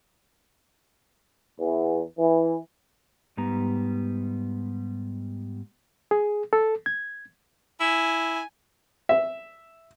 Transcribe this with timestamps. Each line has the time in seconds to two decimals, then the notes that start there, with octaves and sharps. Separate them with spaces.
1.59 E2
2.18 E3
3.37 G#2 G3 B3 A#5
6.11 G#4
6.53 A4
6.86 G#6
7.80 E4 G#5
9.09 E5